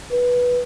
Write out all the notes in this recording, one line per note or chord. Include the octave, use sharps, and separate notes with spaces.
B4